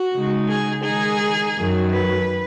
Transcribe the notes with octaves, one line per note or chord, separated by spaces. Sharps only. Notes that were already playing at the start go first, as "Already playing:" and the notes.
Already playing: F#4
C#3 G#3 D#4
G#4
D#3 G#3 D#4 G#4
F#2 D#3 F#3
B4